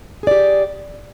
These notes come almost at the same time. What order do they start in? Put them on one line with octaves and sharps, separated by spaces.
G#4 D5 G4